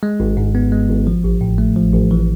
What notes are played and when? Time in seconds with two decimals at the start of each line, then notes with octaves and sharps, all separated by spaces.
0.03 G#3
0.20 G#1
0.37 G#2
0.55 B3
0.72 G#3
0.90 G#1
1.07 F3
1.24 A1
1.41 A2
1.58 A3
1.76 F3
1.93 A1
2.11 E3